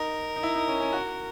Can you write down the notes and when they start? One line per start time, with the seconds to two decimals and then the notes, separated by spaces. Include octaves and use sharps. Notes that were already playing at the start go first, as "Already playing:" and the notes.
Already playing: D#4 A#4
0.36 D#4
0.43 E4
0.55 D#4
0.68 C#4
0.80 C#4
0.93 F#4